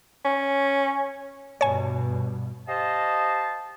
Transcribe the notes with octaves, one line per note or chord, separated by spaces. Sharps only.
C#4
G2 B2 C#5 G#5
G4 C5 D#5 F5 A5